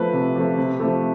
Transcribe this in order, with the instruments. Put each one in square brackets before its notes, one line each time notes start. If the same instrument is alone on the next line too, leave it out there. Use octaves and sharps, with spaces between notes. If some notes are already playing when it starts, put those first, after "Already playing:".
Already playing: [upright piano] F3 A3 B4
C3
F3 A3
C3
F3 A3